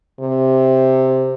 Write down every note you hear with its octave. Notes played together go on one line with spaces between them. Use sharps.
C3